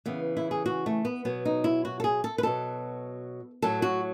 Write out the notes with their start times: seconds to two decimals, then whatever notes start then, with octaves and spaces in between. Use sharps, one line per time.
0.06 C#3 E3 B3
0.37 E4
0.51 G#4
0.66 F#4
0.86 A3
1.05 B3
1.25 B2 F#3 B3
1.45 D#4
1.64 E4
1.85 F#4
2.00 A4
2.04 G#4
2.24 A4
2.38 B4
2.43 B2 F#3 A4
3.62 A2 F#3 A4
3.82 F#4